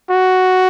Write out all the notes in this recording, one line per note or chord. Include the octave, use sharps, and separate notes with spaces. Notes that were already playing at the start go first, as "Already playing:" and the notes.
F#4